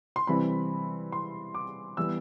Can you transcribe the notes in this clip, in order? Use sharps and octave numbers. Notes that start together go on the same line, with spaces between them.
C6
C3 E3 G3 C4 B5
C6
D6
E3 G3 B3 E6